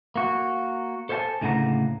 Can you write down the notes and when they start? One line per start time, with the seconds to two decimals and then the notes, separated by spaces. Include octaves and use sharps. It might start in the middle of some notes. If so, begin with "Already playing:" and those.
0.16 A#3 F#4
1.09 A4 C5 C#5 F5 G#5 A5
1.41 D2 A2 C#3 A#3 F#5 A#5